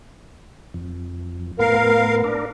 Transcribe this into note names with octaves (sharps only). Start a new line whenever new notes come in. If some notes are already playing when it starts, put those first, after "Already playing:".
F2
A2 B3 A#4 F5
D4 A#4